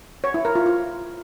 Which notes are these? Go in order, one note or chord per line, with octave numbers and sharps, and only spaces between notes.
C#5
E4
A#4
F4
F4